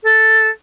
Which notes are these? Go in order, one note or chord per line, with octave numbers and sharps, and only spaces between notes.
A4